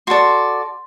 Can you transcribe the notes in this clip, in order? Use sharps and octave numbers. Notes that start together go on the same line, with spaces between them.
F#4 A4 D5 C6